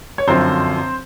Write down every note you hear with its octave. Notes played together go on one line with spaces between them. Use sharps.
C#5
G1 F#2 D3 F3 C4 C5